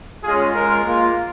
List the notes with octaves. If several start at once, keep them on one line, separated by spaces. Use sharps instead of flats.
G#3 C#4 F4 G#4
G#3 F4 A#4
A#3 F4